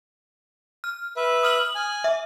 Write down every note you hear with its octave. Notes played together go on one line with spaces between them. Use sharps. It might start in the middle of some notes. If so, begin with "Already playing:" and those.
F6
B4 E5
D#6 F6 F#7
G#5
E5